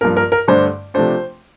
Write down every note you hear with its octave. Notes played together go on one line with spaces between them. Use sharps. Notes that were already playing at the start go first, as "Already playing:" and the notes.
G2 F3 A#3 A#4
A#4
A#4
G2 D3 A3 D4 C5
C3 F3 A3 D4 C5